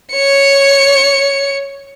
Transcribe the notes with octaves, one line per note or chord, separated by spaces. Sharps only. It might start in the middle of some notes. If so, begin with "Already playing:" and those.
C#5 C#7